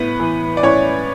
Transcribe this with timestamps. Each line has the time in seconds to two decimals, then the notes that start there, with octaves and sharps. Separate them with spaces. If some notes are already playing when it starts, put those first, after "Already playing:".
Already playing: A2 B3 B4
0.20 E3
0.57 D5
0.63 A2 C#4 C#5